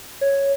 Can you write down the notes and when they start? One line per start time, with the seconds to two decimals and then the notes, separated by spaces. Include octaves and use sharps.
0.21 C#5